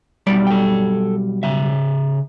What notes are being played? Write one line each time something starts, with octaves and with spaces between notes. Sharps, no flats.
B1 G3 D5
A4 G5
C#3 E5